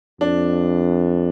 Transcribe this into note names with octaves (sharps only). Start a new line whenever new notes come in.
F2 D4